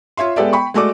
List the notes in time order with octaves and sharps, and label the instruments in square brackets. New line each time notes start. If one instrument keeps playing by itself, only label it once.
[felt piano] F4 C#5 E5 C6
G#3 B3 G4 A4 D5 E5
G5 B5 C#6
G#3 A3 F#4 A4 D5 D6